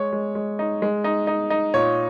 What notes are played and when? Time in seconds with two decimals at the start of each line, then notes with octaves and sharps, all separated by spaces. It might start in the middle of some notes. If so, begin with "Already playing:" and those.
Already playing: G#3 C#5
0.12 G#3
0.35 G#3
0.59 D#4
0.82 G#3
1.04 D#4
1.27 D#4
1.50 D#4
1.74 A#2 C#5